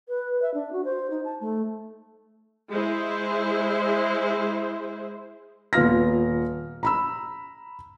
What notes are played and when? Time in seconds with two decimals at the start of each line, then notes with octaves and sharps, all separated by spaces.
0.08 B4
0.42 E5
0.54 D4
0.73 F#4
0.85 C5
1.10 D#4
1.25 A5
1.41 A3
2.69 G#3 E4 C5
5.73 D#1 B3 F4 F6 A#6
6.83 A#5 B5 E6